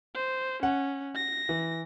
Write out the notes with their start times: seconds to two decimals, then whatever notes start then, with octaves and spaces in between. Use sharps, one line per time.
0.15 C5
0.63 C#4 F#5
1.16 A#6
1.49 E3